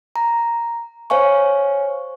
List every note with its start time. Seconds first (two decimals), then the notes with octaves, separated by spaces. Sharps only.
0.16 A#5
1.10 C5 C#5 F5 G#5 C#6